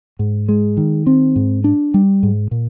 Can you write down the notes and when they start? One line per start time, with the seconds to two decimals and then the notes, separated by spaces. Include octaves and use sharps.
0.19 G#2
0.49 G#3
0.77 D#3
1.07 C4
1.36 G#2
1.64 D4
1.94 G3
2.23 G#2
2.51 A#2